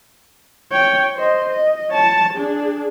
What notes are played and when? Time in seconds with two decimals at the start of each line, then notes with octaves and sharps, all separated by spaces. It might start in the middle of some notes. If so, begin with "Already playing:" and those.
0.72 C#5 G5
1.15 C5 D#5
1.50 D#5
1.91 C#5 A5
2.33 D4 G#4